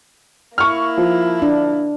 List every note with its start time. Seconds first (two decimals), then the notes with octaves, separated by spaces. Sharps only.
0.58 A#3 E4 C#6 F6
0.97 F3
1.42 D4